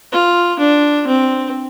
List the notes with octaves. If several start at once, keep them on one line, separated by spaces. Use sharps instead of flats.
F4
D4
C4